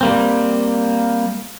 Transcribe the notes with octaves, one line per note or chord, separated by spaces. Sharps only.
G3 A#3 C4